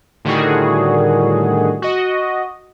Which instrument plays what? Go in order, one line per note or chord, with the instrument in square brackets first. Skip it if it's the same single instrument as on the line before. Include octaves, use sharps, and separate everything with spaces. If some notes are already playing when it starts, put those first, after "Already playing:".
[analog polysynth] A2 D3 D#3 G3 F#4 G#4
F#4 D#5